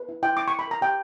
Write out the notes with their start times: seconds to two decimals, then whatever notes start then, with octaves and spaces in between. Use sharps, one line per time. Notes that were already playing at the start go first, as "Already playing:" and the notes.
Already playing: B4
0.09 E4
0.23 E4 G5
0.37 E4 D6
0.48 E4 C#6
0.59 B5
0.67 A#4 A#5
0.81 G4 G5